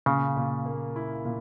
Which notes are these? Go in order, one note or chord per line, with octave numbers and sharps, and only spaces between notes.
A#2 C#3
A#2
A#3
E4
A#2